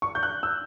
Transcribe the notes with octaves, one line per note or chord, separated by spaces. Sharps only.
C#6
G6
F#6
E6